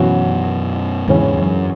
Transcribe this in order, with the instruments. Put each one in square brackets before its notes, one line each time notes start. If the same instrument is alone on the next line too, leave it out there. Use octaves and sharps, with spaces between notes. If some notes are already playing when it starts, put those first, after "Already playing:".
Already playing: [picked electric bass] F#2 B2 [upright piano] E3 C#4 F#4
[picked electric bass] E2 G#2 [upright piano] C#3 E3 C#4
[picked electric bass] F#2